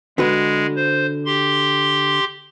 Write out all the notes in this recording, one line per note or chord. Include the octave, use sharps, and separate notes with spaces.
D3 G#3 F#4 B4
C5
G4 C6